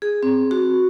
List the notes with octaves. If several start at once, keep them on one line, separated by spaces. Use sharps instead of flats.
G#4
C4
F#4